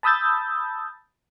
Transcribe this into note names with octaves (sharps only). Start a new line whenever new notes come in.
A5 B5 D#6 E6 G6 A6